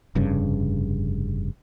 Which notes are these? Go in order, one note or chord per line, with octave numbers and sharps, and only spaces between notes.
F1 G2 C#3